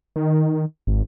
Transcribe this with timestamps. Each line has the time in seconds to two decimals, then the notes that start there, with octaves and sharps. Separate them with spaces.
0.16 D#3
0.87 G#1